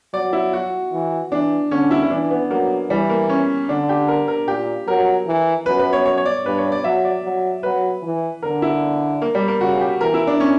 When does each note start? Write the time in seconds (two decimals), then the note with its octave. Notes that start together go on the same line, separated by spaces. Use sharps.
0.14 F#3 D5
0.33 E4
0.53 F#4
0.93 E3
1.32 E3 D4
1.71 D3 C#4
1.91 E4
2.03 E4
2.10 E3 D4
2.30 B3
2.50 F#3 A#3
2.90 E3 G3
3.09 A#3
3.29 C#4
3.68 D3 D4
3.89 G4
4.08 A#4
4.28 A#4
4.48 A#2 G4
4.87 F#3 A#4
5.27 E3
5.66 F#2 B4
5.79 B4
5.93 C#5
6.05 C#5
6.17 C#5
6.26 D5
6.45 G2 B4
6.58 C#5
6.72 D5
6.84 F#3 E5
7.05 D5
7.24 F#3
7.63 F#3 B4
8.03 E3
8.42 D3 A#4
8.62 E4
9.22 A#3
9.35 G3
9.48 A#3
9.61 C#3 F#4
9.81 G4
10.01 E3 A#4
10.14 E4
10.27 D4
10.40 C#4